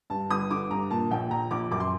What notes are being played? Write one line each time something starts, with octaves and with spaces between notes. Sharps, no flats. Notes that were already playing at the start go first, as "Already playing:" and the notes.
G2 A5
G1 D#6
D3 D6
G2 A#5
A#2 A5
A#1 G5
A#1 A#5
A#1 D6
F#2 D6
C6